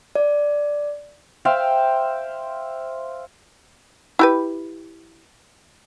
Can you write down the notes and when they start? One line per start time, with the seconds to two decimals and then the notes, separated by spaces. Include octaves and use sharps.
0.15 D5
1.45 C5 E5 F5 G5
4.19 E4 G4 B4